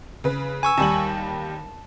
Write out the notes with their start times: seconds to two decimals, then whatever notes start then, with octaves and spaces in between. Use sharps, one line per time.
0.24 C#3 B4
0.63 G#5 C#6 E6
0.78 D#2 G3 A5 F#7